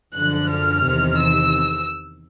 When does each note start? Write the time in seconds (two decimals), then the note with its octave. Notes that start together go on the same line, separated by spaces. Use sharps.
0.14 F#2 D3 F3 F#6
0.48 F6
0.83 E2 C3 D#3
1.18 E6